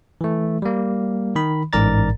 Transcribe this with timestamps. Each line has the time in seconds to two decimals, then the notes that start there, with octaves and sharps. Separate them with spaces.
0.21 E3 A3
0.62 G3 A#3
1.36 D#3 B5
1.73 A1 G#2 A#4 D5 A#5 A6